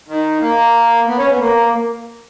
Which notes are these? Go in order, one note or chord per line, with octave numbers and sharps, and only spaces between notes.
D#3
A#3
B3
C#4
B3
A#3